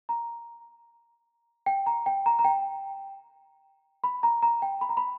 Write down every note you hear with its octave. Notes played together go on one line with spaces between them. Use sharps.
A#5
G5
A#5
G5
A#5
A#5
G5
B5
A#5
A#5
G5
B5
A#5
B5